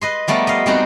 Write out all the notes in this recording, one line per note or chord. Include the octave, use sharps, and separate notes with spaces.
B4 D#5 C6
F3 G3 A3 B3 A#4
D#5 F5
G3 G#3 B3 C4 D#4 F#4